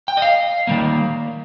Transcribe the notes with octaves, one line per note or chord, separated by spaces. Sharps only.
G5
D#5
F5
D#3 G3 A#3